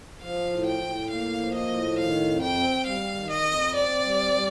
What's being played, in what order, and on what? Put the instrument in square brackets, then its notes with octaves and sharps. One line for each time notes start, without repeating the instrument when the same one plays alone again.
[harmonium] F3 [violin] F5
[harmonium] A2
[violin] G5
[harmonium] A2
[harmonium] A#3 [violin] F5
[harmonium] F3
[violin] D#5
[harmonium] A2
[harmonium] D#3 [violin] F5
[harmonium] F2
[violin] G5
[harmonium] C4
[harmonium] G3 [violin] F5
[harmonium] D#3
[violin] D#5
[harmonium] F2
[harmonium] C4 [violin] D5
[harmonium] G3
G3